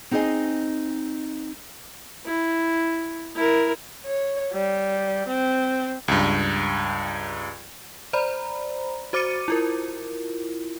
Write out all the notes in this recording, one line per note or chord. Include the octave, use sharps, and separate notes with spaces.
C4 D#4 G#4 A4 D#5 G#5
E4
E4 A#4
C#5
G3
C4
C#2 G2
C5 D5 A#5 B5
F#4 C5 D6 A6 C#7 D#7
E4 F4 A#4